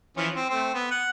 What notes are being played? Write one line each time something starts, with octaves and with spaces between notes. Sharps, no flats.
E3 F3 C#4
C4
A3 C4
B3
F#5